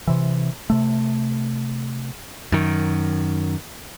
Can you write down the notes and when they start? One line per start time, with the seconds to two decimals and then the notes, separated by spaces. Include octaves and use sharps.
0.07 C3 E3
0.70 C3 A3
2.52 F#2 D#3